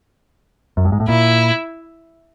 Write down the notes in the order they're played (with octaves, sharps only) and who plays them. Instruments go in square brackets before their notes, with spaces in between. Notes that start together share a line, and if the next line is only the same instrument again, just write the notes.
[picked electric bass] F#2
G2
G#2
A2
[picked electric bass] A#2 [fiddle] E4